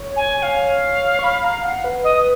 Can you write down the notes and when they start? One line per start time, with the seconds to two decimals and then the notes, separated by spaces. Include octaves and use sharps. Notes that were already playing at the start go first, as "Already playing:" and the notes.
Already playing: C#5
0.16 G#5
0.43 F5
1.19 C#6
1.24 B5
1.44 A#5
1.63 F#5
1.84 B4
2.04 D#5